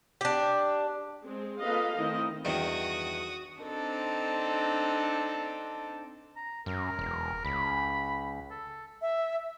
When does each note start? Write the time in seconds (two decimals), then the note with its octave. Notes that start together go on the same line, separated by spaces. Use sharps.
0.21 D4 G4
1.23 G#3 C4
1.62 A#3 F4 A4 B4 D#5 F5
1.97 D#3 A3 C4 E4 D#5
2.45 E2 G2 D#3 F#4 D#6
3.62 C4 D4 D#4 A4
6.36 A#5
6.66 F#2 A#4
6.99 E1
7.45 C#2 B5
8.50 A4
9.02 E5